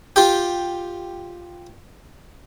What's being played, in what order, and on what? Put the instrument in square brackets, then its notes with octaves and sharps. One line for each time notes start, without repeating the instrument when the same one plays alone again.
[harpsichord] F4 G4